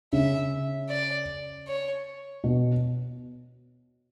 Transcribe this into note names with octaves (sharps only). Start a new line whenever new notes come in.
C#3 E5
D5
C#5
B2